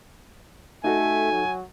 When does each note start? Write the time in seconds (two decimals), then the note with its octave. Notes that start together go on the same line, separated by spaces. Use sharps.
0.84 A3 D#4 F#4 A4 G#5
1.33 F#3